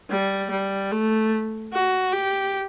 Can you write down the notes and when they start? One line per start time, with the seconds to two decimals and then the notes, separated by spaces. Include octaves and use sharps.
0.10 G3
0.50 G3
0.92 A3
1.73 F#4
2.13 G4